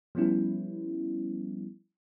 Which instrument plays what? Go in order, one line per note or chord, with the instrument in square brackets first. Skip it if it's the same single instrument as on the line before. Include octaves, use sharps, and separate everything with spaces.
[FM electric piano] F3 G3 B3 C#4 E4